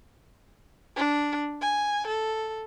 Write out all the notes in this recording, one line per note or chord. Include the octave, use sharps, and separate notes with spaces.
D4
G#5
A4